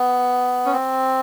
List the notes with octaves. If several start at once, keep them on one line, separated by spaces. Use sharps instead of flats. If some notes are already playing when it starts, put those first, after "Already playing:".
Already playing: B3
C#4
C4